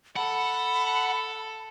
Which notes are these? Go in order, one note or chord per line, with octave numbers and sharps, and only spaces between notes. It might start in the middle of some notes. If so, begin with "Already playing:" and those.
A4 F#5 B5